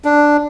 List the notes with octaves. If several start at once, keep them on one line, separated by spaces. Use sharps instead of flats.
D4